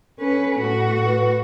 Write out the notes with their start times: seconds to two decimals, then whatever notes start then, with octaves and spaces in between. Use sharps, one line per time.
0.19 C#4 A4 B4
0.61 A2 F#4
1.06 B4